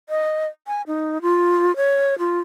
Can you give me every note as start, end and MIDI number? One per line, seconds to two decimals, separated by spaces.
0.09 0.48 75
0.67 0.82 80
0.87 1.22 63
1.22 1.75 65
1.76 2.18 73
2.19 2.40 65